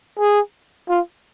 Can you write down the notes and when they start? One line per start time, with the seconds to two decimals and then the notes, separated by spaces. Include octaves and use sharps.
0.19 G#4
0.89 F4